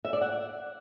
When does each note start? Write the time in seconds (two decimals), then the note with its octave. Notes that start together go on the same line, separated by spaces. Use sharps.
0.05 E5
0.13 D5
0.21 F#5